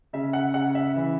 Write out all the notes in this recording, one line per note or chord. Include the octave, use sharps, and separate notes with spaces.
C#3 E5
F#5
C#3 F#5
E5
E3